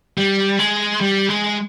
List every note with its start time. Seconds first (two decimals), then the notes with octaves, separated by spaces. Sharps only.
0.17 G3
0.59 G#3
1.01 G3
1.29 G#3